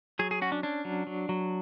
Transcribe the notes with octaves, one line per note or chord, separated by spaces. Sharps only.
F#3 G#4
G#4
C#4 F#4
D4
C#4 D4
F#3
F#3
F#3